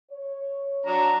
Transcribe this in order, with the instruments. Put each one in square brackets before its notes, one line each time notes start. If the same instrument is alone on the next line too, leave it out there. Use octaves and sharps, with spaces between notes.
[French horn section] C#5
[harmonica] F#3 D4 [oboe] A#5